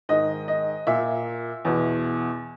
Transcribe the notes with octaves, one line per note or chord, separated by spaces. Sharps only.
G#2 D#3 D#5
D#5
A#2 E5
E2 B2